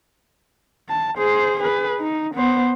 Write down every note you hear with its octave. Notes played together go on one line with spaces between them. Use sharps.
A5
G#4 C5
G#4 B4
D#4
B3 C5